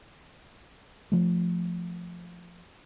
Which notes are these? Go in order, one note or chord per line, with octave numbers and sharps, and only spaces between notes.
F3 A3